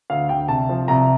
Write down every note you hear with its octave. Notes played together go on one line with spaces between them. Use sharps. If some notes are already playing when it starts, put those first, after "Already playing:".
D2 F5
D2 G5
C2 A5
F3
C2 A#5